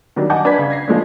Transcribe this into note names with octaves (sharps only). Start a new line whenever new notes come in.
D#3 F#3 G3 D4
D#5 F#5 G#5 A5 D6 G6
D4 B4 D6 G#6 B6
C#3
G#6 A#6 C7
F3 G#3 A3 D4